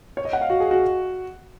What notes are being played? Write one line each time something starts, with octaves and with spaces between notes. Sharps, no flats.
C#5
D#5
F#5
F5
F#4
G#4
F#4